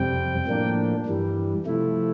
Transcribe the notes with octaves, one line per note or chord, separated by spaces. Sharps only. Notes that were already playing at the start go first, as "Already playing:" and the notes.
Already playing: F2 C3 G3 C4 G5
A2 F3 A#3 D4
G2 E3 G3
C3 F3 A3 E4